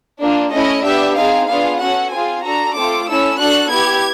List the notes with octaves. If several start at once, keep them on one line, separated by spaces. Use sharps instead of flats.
A#3 D4 F4
A3 C#4 E4 D#5
B3 D4 G4 E5
C4 D#4 G#4 F5
B3 D4 F4 G#4 F5
C#4 F#4 A4 F#5
C4 F4 G#4 G#5
D4 F#4 A4 A#5
A3 C4 F4 A4 D6
C#4 E4 A4 E6
D4 F#4 A4 F#6
B3 E4 G4 G#6